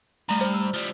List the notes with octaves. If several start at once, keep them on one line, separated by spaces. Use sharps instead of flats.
G2 A3 A#5
C5
E6
F3 G3